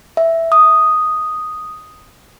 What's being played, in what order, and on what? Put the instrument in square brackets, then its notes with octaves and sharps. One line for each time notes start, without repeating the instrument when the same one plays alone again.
[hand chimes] E5
D#6